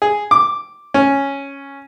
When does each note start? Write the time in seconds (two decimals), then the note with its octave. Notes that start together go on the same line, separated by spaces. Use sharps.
0.02 G#4
0.31 D6
0.94 C#4